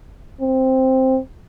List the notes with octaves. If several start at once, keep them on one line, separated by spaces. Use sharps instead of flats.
C4